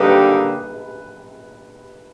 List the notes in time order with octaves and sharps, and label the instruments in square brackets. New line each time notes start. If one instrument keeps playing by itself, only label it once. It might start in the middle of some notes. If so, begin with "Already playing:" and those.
Already playing: [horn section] D3 G3 A#3 D#4 G4 [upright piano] B4